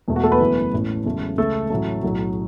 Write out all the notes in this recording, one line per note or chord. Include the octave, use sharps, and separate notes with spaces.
E1 E2 B2 A3
F#4
A3 A4
B3 B4
F#1 E2 E3 A3
A1 A2 A3
E1 E2 C#3 F#3 A3
C#2 C#3 A3 A4
A1 A2 F#3 A3
B1 A2 F#3